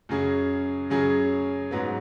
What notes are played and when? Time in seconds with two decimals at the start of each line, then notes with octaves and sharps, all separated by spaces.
0.09 F#2 C#3 F#3 C#4 G#4
0.90 F#2 C#3 F#3 C#4 G#4
1.71 G#2 F#3 B3